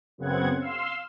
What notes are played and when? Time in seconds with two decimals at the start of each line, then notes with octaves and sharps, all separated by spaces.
0.18 F#2 C#3 B3 C4 F#5 G#6
0.61 F5 C6 E6